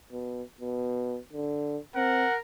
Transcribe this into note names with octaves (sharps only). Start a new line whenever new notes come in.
B2
B2
D3
C4 A#4 F#5